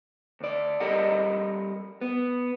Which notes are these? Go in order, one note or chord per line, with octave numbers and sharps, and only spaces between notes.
D2 D5
G3 G4 A4 A#4 D#5 F#5
B3